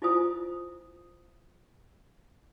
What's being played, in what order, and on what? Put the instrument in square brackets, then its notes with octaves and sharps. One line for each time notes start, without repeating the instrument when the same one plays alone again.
[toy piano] E4 F4 C5 D#6